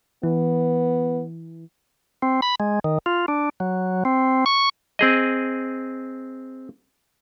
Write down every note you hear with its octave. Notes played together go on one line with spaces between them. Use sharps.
E3 B3
C4
B5
G#3
D#3
F4
D4
F#3
C4
C#6
C4 G#4 D#5